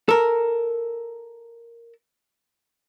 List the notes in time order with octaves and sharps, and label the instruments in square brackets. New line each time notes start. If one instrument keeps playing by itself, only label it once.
[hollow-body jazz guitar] A4 A#4